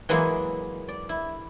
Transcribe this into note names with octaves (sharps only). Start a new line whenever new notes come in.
E3 F#3 G#3 A#3 E4
D5
E4